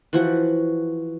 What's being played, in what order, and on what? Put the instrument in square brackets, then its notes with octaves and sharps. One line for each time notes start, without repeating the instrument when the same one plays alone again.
[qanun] E3 F3 F#4